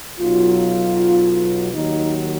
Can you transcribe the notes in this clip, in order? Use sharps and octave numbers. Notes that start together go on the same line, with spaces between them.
B1 B2 F#3 F4
D#2 D#3 F#3 D#4